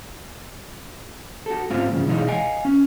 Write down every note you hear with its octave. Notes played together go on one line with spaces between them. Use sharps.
F#4 A4
G#2 A3 C4 C#4 F4 F5
G2 C#3 F3
B1 E3 G#3 D#4 C#5 F5
D#5 F5 G#5
C#4